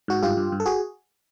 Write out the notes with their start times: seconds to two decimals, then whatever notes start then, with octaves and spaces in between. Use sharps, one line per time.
0.08 G#2 F#4
0.22 G2 F4 G4
0.37 G2
0.52 G2
0.60 A4
0.66 F#4 G#4